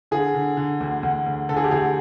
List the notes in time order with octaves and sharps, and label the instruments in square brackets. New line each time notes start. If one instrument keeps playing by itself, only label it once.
[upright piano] D3 G#4
D3
D3
D2
D2
D2
D3 A4
G#4
G4
D2 G#4